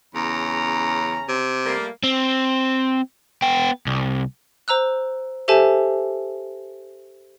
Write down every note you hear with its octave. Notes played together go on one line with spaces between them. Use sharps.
E2 C#3 C#4 A#5
C3
G3 A3 A#3
C4
B3 G5
C2
C5 A#5 E6 F#6
G4 A4 C5 E5 G#5 A5